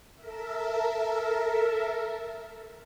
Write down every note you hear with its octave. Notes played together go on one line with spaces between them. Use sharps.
A4 A#4 E5